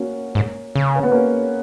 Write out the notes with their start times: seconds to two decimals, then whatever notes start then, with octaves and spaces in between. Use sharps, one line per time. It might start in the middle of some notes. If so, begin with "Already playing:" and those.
Already playing: A#3 C#4 F#4
0.35 G#2
0.75 C#3
0.95 C#4
1.03 B3
1.11 A#3 C#4